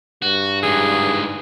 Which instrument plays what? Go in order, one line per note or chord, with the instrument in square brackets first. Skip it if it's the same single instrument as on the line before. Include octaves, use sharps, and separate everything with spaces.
[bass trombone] G2 [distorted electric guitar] F#4
[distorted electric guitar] G#2 E3 [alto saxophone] G#4